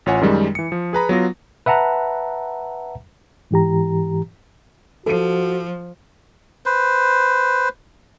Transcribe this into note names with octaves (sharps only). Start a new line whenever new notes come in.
A1 F4 C#5 F#5 G#5
F#2 D#3 G3 G#3
E3 C#7
F3
G#4 B4 A#5 B5
F#3 B3 F4 A#6
B4 E5 F#5 A5 A#5
G#2 E3 G4 A#5
F3 F#4 A4 D#7
B4 C5